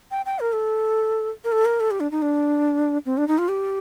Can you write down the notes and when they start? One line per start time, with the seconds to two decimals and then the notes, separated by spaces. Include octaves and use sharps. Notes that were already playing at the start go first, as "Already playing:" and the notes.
0.11 G5
0.26 G5
0.40 A#4
0.53 A4
1.44 A#4
1.52 A4
1.65 A#4
1.80 A4
1.91 G4
2.00 D4
2.11 D#4
2.22 D4
3.06 C4
3.17 D4
3.28 D#4
3.38 F4
3.48 G4